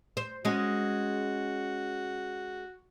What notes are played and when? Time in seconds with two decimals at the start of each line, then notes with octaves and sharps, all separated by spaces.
0.17 C5
0.45 G#3 C#4 F#4